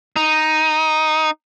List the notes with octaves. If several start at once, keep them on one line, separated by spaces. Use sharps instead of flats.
D#4